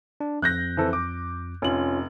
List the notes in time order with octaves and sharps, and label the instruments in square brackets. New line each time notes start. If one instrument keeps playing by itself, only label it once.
[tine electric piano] D4
[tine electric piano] F2 [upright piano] F#6 G6 A#6
[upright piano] E3 C4 A4
D6
[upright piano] F1 F#7 [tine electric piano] C#4 F4